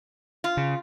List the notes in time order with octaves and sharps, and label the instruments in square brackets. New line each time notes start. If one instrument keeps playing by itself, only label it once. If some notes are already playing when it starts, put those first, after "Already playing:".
[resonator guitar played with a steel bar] F4
[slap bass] C#3